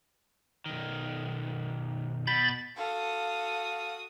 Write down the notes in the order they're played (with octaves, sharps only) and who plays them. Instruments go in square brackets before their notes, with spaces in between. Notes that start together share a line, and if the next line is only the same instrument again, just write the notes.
[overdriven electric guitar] B1 D#3
[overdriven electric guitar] B2 [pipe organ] B5 G6 A6
[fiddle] F#4 D#6 [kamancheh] A4 F5